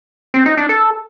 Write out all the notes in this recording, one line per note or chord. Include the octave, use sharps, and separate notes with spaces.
C4
D#4
D4
A4